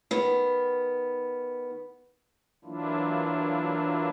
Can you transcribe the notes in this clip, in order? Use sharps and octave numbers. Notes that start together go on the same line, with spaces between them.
D#3 B3
E3 F#3 A#3 D4 E4 F4